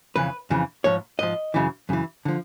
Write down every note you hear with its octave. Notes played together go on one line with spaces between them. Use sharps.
F2 C#3 E3 B4
F2 C#3 E3
G#2 F3 C#5
G#2 F3 D#5
F#2 C#3 E3
F#2 C#3 E3
D3 F3